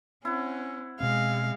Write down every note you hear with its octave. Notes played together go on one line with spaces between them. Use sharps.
C4 C#4 E4 F#5
B2 G#3 C4 F5